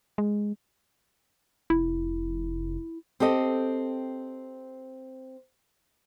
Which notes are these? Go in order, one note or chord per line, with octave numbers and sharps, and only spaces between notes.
G#3
F1 E4
C4 G4 A4 D#5